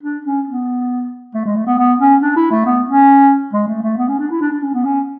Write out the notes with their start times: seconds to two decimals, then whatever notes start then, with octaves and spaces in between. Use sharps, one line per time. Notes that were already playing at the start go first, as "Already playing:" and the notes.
0.03 D4
0.25 C#4
0.47 B3
1.34 A3
1.46 G#3
1.56 A3
1.67 B3
1.79 B3
2.00 C#4
2.22 D4
2.37 E4
2.51 A3
2.66 B3
2.87 C#4
3.53 G#3
3.68 A3
3.83 A3
3.98 B3
4.08 C#4
4.19 D4
4.31 E4
4.41 D4
4.52 D4
4.63 C#4
4.74 B3
4.85 C#4